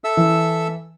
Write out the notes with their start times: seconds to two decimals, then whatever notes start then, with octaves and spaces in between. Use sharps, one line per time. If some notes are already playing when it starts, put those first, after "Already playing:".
0.04 A4 E5 E6
0.17 E3